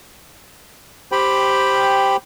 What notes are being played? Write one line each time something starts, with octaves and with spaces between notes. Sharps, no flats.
G4 C5 G5 B5